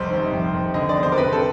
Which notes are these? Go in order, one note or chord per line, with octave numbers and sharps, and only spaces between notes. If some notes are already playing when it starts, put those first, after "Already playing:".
Already playing: F1 C2 C5
D#3
F2
F2
D3 D#5
D5
E1
C5
A#4
C3 B4
A4